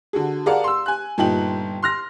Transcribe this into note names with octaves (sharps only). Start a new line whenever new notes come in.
D3 F#4 G#4
G#4 A#4 D5 F5 F#5 A5
C6 E6
G#5 F#6
G1 A#2 D#4 G5 F#7
C6 F6 A#6